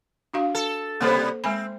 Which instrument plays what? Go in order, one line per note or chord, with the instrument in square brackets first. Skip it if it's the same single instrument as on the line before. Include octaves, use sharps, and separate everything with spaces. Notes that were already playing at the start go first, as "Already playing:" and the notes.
[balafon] D4 F#4 F5
[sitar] A4
[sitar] C3 G3 B3 [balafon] A#3 A4 C5
[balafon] G#3 G#5 B5 [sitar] C4